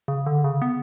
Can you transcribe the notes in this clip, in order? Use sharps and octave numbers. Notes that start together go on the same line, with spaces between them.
C#3
D3
C#3
B3